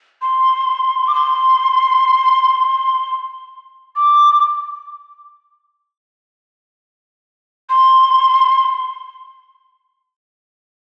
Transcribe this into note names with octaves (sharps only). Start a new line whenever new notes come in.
C6
D6
C6
D6
C6